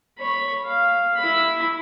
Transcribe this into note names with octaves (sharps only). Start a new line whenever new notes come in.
C#5 B5
F5
E4 B5